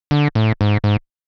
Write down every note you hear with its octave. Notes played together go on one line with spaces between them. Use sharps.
D3
A2
G#2
G#2